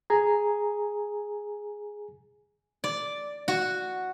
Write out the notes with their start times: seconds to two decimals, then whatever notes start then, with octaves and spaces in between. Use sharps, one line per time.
0.10 G#4 G#5 A#5
2.84 D5
3.48 F#4